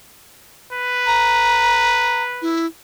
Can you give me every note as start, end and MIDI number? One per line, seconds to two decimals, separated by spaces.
0.73 2.60 71
1.06 2.23 82
2.42 2.66 64